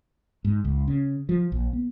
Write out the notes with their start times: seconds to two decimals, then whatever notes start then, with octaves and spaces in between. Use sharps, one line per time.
0.44 G#2
0.64 C#2
0.88 C#3
1.29 F3
1.52 A#1
1.73 B3